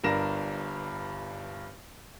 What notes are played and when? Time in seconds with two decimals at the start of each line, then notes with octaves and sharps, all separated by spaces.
0.04 G1 G2 D4 A#4 A#6 E7